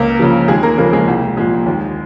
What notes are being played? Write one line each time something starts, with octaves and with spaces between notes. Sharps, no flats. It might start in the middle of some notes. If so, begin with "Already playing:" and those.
Already playing: C#2 A#3 A#4
C#3 F3
D#2 G#3 G#4
A#3 A#4
C#3 F3 A#3 A#4
G#3 G#4
C2
A#2 F3 G#3 G#4
D#2